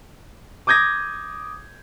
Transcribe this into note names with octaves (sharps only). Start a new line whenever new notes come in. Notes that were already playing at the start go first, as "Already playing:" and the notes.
D6 D#6 G6 G#6 A#6